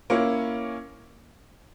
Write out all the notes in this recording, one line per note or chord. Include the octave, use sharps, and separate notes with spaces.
A#3 C#4 E4